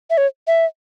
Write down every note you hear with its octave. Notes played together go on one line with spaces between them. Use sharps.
E5
C#5
E5